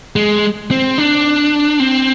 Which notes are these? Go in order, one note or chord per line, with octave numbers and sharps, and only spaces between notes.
G#3
C4
D4
C4